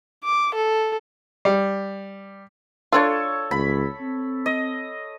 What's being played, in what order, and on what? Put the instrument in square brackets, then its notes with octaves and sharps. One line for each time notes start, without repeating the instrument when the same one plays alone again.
[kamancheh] D6
A4
[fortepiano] G3
[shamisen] D4 F4 [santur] A4 C#5
[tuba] C#2 [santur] B5
[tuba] C4
[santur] D#5